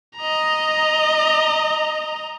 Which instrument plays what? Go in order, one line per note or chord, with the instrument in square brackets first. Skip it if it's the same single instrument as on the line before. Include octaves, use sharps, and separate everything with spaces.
[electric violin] D#5 A#5